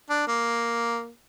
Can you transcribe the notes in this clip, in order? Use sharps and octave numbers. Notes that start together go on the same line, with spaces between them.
D4
A#3